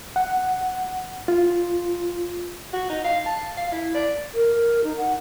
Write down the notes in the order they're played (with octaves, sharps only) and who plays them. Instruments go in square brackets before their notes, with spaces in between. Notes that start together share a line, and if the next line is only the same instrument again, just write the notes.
[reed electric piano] F#5
F4
[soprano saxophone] F#4
D#4
F5
A5
F5
E4
D5
[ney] A#4
D#4
F#5